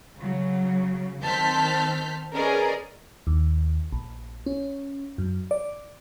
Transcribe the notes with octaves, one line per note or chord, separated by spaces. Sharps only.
C#3 F#3
D#3 C4 A5 F6 G6 B6
C#4 G#4 A#4 B4 D5 D#5
D#2
A#1
C#4
F#2
D5